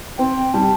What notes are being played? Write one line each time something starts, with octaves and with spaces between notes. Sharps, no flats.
C4 G5
G3 A5